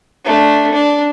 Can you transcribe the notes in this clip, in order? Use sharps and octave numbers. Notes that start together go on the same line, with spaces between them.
A3 D4
D4